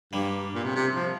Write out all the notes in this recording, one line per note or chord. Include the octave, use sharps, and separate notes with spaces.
G2 G3 A#3
A#2
C3
C3
F3